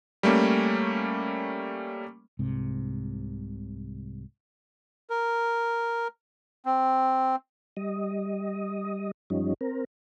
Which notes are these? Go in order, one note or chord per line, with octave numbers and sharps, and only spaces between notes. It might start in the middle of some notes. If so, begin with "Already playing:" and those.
G3 A3 A#3 C#4
C2 G#2 C3
A#4
C4
G3 D#5
F#2 F3 G3 C#4 D#4
C4 A#4